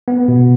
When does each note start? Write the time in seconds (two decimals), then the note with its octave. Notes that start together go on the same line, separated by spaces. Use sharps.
0.08 B3
0.28 B2